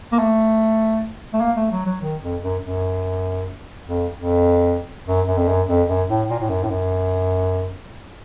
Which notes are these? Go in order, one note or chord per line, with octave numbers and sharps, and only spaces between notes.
A#3
A3
A3
A#3
A3
F#3
F#3
D#3
F2
F#2
F#2
F2
F2
F#2
F#2
F2
F#2
F2
F#2
A2
A#2
A2
F#2
A2
F#2